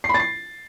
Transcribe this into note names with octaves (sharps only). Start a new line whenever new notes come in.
C7
B5
A6
C7